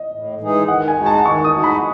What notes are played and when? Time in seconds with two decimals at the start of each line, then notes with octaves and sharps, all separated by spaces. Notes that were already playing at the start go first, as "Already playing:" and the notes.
Already playing: D#5
0.12 A2
0.41 E3 G#3 D#4 G#4
0.68 D#3 F#5
0.88 G#5
0.97 G#3 D#4 F#4
1.06 A5
1.25 D#3 C#6
1.44 D#6
1.54 G#3 D#4 F#4
1.64 B5